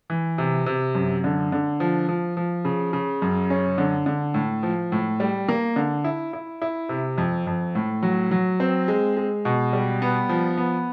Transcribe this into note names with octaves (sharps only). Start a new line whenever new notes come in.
E3
C3
C3
F#2
D3
D3
F3
F3
F3
C#3
C#3
F#2
C#4
D3
D3
A2
F3
A2
G3
A#3
D3
E4
E4
E4
C3
F2
F2
A2
F#3
F#3
C4
G#3
G#3
B2
G3
B3
F3
B3